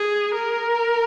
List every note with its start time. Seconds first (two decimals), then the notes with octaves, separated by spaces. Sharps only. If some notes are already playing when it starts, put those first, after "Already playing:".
Already playing: G#4
0.34 A#4